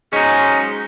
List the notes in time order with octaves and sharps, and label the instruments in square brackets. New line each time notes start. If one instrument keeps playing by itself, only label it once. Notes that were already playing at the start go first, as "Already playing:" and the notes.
[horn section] G#2 F#3 G#3 [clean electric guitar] C#4 D#4